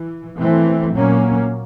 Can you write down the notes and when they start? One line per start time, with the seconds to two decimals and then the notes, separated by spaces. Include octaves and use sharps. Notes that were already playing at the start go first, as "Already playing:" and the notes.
Already playing: E3
0.37 E3 A3 C4
0.93 A#2 F#3 A#3 C#4